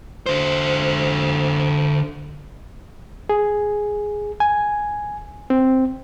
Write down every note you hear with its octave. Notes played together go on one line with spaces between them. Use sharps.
D3 C5
G#4
G#5
C4